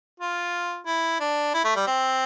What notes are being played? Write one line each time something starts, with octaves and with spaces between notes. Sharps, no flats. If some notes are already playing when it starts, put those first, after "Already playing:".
F4
E4
D4
E4
A3
G3
C4